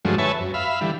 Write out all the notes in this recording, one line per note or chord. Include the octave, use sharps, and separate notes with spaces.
G2 D3 F3 F#3 G#3 A3
B4 C#5 E5 G#5 A5
F#2
E5 F5 B5
D3 E3 G3